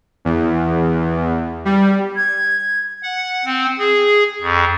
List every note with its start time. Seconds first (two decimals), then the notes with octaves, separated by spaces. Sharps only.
0.25 E2
1.65 G3
2.16 G#6
3.03 F#5
3.45 C4
3.79 G#4
4.42 F2